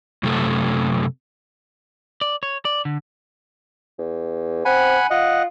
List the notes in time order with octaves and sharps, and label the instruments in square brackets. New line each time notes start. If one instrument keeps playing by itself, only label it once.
[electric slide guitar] F#2 C3 A3 A4
[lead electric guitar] D5
C#5
D5
D3
[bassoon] E2
[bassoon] C4 [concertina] F#5 G#5 B5
[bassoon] F4 [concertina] D#5 F#5